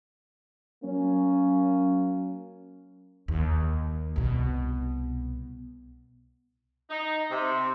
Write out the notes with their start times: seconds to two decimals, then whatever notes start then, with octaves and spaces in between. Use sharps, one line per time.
0.84 F#3 A#3 C#4
3.28 D#2
4.16 C2 B2
6.90 D#4
7.30 C3